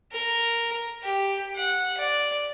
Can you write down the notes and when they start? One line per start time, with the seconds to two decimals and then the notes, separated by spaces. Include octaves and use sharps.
0.12 A#4
1.03 G4
1.55 F#5
1.98 D5